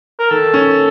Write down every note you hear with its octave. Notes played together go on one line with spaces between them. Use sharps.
A#4
D#3 A4
C#4